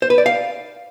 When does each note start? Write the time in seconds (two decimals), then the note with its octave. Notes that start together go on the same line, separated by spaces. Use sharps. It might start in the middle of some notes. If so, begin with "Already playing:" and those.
0.02 C5
0.10 B4
0.18 D5
0.26 F5